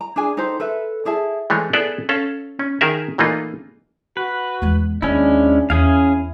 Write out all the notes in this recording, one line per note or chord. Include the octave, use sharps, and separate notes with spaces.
A#5
D4 G#4 G#5
D#4 G4 A4 C5
A4 B4 E5
E4 G#4 E5 A5
E3 G#3 A3 G#4 C#5
B3 E4 G#4 A4 D5
C#4 A4 F5
C#4
D#3 G#4 A#4 E5
A#2 E3 A3 A#3 D#4 F4
F#4 B4
E2 G#3
D#2 G#3 B3 C#4 D4 E4
E2 C#4 E4 G#4 F5